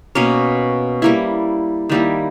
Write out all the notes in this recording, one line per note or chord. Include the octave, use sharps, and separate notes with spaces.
B2 A#3 C#4
G3 A#3 E4
D#3 G3 A#3 E4